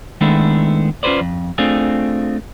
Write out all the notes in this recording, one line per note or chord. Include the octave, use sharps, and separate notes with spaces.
D#3 G#3 A3 B3 D4 E4
C#4 F4 G#4 B4 C5 D5
F2
A3 C4 D4 F4 G#4